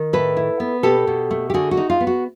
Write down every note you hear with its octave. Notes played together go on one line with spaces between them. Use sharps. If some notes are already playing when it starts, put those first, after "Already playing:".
Already playing: D#3
A2 A4 B4
E4
B3
B2 G4 A4
B2
A3
G4
D3 F#4 G#4
F#4
D#4
F4
B3
F#4